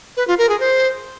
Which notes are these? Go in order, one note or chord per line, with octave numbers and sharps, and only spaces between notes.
B4
F4
A#4
G#4
C5